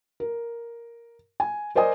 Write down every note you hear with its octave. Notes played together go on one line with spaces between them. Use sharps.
A#4
G#5
A#4 C5 D5 D#5 G#5 D#6